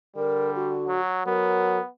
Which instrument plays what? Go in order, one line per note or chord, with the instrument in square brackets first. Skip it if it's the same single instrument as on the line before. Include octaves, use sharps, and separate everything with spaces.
[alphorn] D3 [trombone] G3 [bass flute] A#4
[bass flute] F#4
[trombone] F#3
[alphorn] F#3 [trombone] B3 [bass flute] A#4